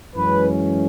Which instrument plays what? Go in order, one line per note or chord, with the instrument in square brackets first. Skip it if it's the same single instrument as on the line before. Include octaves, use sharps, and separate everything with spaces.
[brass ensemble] F#2 E3 G#3 C#4 B4